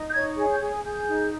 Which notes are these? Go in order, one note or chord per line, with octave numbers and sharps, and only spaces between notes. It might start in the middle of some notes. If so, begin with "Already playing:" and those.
Already playing: D#4
G6
C#5 G#6
G#4
G6
G#4
G#4 G6
D#4